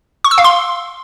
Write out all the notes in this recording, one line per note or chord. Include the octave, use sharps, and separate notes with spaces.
C#6
E6
F5
C6